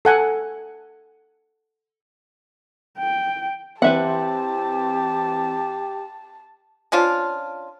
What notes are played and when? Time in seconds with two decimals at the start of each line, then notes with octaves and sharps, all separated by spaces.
0.05 A4 F#5 G#5
2.98 G5
3.82 E3 C4 G4 B4 E5 F#5 A5
6.92 F3 C#4 D4 F4